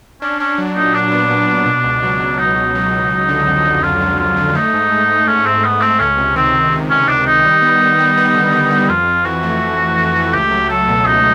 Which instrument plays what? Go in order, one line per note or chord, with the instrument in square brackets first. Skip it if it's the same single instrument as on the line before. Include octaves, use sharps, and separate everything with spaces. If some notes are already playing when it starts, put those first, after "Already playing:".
[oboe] C#4 [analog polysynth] D4
[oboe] C#4 [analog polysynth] D4
[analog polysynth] F#3
[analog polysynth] A#2 [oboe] D#4
[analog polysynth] F#3 [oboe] D4
[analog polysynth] B3
A#2
A#2
B2
C#2
F#3
B2
[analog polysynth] B2 [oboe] D#4
[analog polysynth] B2
F#3
C#2
F#3
D3
F2
D3
[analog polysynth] D3 [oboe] F4
[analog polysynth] F#3
[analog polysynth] F2 [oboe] F4
[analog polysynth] D3
[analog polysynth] A3 [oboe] D#4
[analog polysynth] G#2
G#2
G#2
[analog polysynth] G#2 [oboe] C#4
[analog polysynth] G#2 [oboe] C4
[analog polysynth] G#2 [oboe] B3
[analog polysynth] A3 [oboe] C4
[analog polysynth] C#2 [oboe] C#4
[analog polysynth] C3
[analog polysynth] D#3 [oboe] C4
[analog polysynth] C#2
C3
[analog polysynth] D#3 [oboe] C#4
[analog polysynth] D#3 [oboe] D4
[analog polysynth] D#3 [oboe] D#4
[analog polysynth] G3
B3
B3
G3
B3
D3
G3
G3
[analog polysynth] F2 [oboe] F4
[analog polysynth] F2
[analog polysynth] E3 [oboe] F#4
[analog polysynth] A3
F2
F2
E3
A3
[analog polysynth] C#2 [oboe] G4
[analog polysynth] F#3
[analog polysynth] F#3 [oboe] A4
[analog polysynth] B2
[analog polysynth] C#2 [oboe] D#4